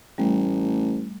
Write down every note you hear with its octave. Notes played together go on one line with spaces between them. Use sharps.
A1 G3 A3